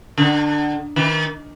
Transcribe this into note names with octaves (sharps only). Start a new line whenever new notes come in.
D3
D#3